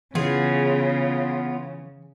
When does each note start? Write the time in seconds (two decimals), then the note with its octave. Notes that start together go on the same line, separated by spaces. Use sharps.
0.15 C#3 E3 B3 F4 G#4